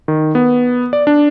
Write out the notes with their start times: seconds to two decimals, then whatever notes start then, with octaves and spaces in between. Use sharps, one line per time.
0.08 D#3
0.35 B3
0.93 D5
1.07 D4